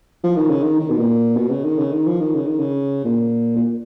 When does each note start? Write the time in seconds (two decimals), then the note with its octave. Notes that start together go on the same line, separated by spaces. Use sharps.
0.24 F3
0.36 D#3
0.49 C#3
0.63 D#3
0.80 D#3
0.90 B2
0.98 A#2
1.36 B2
1.50 C#3
1.64 D#3
1.78 C#3
1.93 D#3
2.06 F3
2.21 D#3
2.35 C#3
2.47 D#3
2.59 C#3
3.05 A#2
3.56 A#2